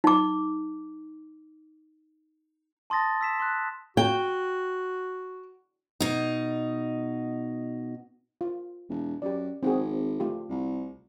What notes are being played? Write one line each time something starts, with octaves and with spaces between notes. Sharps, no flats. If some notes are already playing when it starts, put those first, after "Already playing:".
D#4 D6
A5 C6 D#6 A6 A#6
E6 B6 E7
C6 F#6
F#4 G5
B2 D#4
F4
E1
F#2 G4 D5
G#1 C4 F#4 G#4
A3 F4 G4
C2